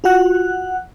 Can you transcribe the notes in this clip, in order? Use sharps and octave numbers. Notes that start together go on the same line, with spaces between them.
F4 F#4 F#5 F#6